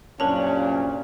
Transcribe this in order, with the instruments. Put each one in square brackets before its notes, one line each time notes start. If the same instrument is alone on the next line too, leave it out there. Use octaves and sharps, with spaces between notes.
[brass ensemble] C2 F#2 A#2 [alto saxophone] C#4 [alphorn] D4 [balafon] A#4 A5